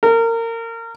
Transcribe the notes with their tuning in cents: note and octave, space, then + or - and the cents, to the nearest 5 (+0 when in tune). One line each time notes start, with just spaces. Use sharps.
A#4 -25